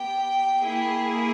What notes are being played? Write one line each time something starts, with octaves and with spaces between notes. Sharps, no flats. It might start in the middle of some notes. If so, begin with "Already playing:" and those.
Already playing: B3 G4 G5
A#3 E4 G#4